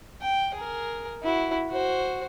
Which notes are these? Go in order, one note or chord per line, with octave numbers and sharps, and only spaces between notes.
G5
G#4 A#4
E4 F#4
F#4 C5